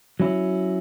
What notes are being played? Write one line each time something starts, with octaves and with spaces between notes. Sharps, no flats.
F#3 C#4 E4